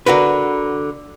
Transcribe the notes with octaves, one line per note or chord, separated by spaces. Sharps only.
D3 F#4 A#4 B4